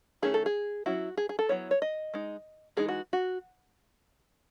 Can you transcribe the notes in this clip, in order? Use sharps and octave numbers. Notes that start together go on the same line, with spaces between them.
D#3 A3 C#4 E4 G#4
A4
G#4
F#3 C#4 E4 F#4
G#4
G#4
A4
F#3 B3 E4 C#5
C#5
D#5
G#3 D#4
E3 G#3 D#4 G#4
F#4
F#4